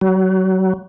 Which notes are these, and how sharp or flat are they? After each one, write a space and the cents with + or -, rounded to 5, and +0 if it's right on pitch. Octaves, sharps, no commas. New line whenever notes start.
F#3 +30